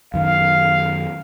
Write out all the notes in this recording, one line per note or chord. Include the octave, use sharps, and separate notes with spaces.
F#2 D#3 F5